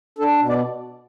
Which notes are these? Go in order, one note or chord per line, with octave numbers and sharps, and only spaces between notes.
D4 A4
B2
D5